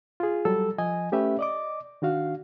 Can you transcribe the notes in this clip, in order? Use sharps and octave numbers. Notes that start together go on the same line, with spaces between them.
F4 G#4
F#3 G3 A4 E6
F3 D#5 G#5
A3 C#4 G4 B4 E5
D5 D#5 D6
D#3 D4 F#4 F5